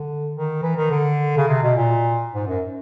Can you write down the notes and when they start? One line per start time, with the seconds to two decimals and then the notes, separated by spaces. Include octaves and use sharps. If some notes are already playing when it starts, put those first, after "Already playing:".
Already playing: D3
0.34 D#3
0.62 E3
0.76 D#3
0.90 D3
1.37 C#3
1.47 C3
1.62 B2
1.76 A#2
2.34 G#2
2.47 F#2